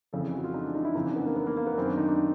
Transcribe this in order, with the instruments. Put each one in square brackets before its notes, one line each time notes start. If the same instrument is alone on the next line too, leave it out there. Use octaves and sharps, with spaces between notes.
[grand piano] F2 C#3 E3 A4
G#4
F#4
F4
D#4
D4
D#4
E4
F2 C#3 E3 D#4
D4
B3
A#3
B3
A#3
A#3
B3
F#2 D#3 C4
D4
D#4
D4